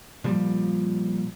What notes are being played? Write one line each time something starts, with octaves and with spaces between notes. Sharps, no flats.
A#2 F3 G3